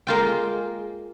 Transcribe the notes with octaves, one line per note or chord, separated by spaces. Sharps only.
G#3 A#3 F4 G5